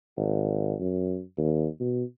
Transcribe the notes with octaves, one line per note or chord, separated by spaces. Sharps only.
G#1
F#2
D#2
B2